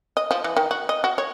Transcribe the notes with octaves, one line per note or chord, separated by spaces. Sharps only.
D#5
F3
E3
D#3
F#4
D#5
F#4
C#5